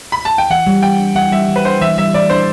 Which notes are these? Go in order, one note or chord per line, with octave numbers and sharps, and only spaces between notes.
B5
A5
G5
E3 F#5
G3
E3 G5
D4
E3 F#5
G3 E5
E3
B4
D4 C5
E3 E5
G3 E5
E3 D5
D4 C5